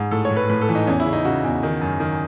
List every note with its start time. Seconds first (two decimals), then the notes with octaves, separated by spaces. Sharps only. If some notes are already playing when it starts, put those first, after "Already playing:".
Already playing: G#2
0.11 A2 A4
0.25 C#5
0.30 A2
0.36 B4
0.50 A2 B4
0.62 A4
0.69 E3
0.75 D#4
0.87 E2 C#4
1.00 E4
1.05 C#3
1.13 D#4
1.25 C#3 F#4
1.44 E2
1.63 D#3
1.81 F#2
2.00 D#3